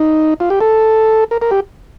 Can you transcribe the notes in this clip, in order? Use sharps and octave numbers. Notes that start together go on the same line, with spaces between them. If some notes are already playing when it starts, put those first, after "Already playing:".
Already playing: D#4
F4
G4
A4
A#4
A#4
G4